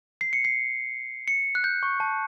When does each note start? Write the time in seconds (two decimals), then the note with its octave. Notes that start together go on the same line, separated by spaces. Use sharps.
0.21 C7
0.33 C#7
0.45 C7
1.28 C#7
1.55 F#6
1.64 G6
1.83 C#6
2.00 A5